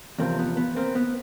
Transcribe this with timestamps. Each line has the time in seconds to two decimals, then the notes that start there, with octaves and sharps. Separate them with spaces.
0.19 E2 C3 F3 A#3 C4
0.39 B3
0.57 B3
0.76 A#3 C4
0.95 B3